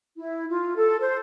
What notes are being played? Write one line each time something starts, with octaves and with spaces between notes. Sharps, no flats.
E4
F4
A4
C5